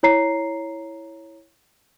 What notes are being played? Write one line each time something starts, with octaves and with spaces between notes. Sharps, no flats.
E4 C#5 A#5 C7